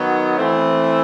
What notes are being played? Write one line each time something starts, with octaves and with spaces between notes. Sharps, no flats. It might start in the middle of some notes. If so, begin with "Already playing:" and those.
Already playing: D#3 F#3 B3
E3 A3 C4